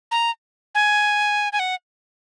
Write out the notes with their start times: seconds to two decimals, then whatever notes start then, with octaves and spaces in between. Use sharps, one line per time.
0.11 A#5
0.75 G#5
1.53 G#5
1.59 F#5